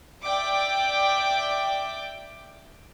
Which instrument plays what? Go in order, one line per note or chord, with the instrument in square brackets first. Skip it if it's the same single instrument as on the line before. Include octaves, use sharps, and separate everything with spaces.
[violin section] D5 E5 G5 D6